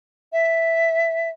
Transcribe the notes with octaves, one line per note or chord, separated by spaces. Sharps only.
E5